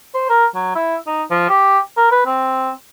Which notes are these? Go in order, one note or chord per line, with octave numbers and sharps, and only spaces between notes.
C5
A#4
F#3
E4
D#4
F3
G4
A#4
B4
C4